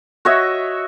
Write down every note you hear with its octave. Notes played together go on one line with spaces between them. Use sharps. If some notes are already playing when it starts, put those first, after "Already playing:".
F#4 C#5 D#5 E5